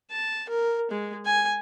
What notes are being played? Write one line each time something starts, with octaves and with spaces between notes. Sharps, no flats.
A5
A#4
G#3
G#5